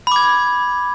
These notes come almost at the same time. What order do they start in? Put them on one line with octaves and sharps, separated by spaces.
B5 D6 G#6